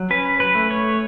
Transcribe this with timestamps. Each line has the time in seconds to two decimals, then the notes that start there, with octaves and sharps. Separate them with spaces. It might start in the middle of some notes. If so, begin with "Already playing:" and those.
Already playing: F#3
0.10 C#4 B4
0.40 B4
0.55 A3
0.71 C#5